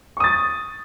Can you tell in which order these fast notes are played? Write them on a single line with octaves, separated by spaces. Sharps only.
C#6 D#6 A6